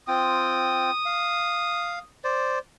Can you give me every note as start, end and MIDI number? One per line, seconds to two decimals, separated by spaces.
0.08 0.91 60
0.08 0.91 65
0.08 0.91 79
0.08 2.07 87
1.05 1.99 77
2.24 2.59 72
2.24 2.59 74